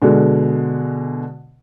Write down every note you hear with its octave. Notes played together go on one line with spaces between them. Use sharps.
B2 D3 G#3